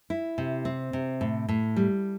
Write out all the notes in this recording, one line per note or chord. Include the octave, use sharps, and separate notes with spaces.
E4
C3
C4
C3
A2
A2
G3